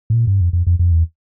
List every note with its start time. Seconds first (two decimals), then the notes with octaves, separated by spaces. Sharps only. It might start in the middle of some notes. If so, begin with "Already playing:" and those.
0.10 A2
0.14 A#2
0.27 G2
0.41 F2
0.53 F2
0.67 F2
0.79 F2
0.92 E2